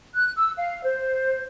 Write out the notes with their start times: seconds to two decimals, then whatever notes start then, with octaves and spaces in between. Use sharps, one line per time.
0.14 F#6
0.37 E6
0.57 F5
0.83 C5